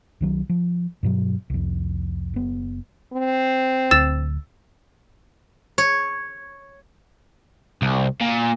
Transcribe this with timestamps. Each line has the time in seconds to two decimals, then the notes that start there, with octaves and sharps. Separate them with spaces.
0.21 C2 D#3 F#3
0.49 F3
1.03 G2 B2 F#3
1.50 C2 F2
2.34 F#1 B3
3.13 C4
3.91 D1 D2 E6 A6 E7
5.78 C#5
7.82 C2
8.21 A#2